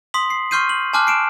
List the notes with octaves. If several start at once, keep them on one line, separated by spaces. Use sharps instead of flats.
C6 D#6 B6 F#7
C7
C6 C#6 F6 G6 C7 D#7
F#7
G#5 A5 C6 D6 F6 F#6
C7 D7 E7